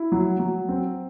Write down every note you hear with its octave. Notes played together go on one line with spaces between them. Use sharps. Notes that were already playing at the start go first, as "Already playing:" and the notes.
Already playing: E4
F#3
F#3
C4